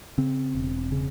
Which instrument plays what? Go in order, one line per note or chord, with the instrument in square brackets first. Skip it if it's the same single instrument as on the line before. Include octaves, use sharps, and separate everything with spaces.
[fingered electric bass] C#3 C4
E1
C#3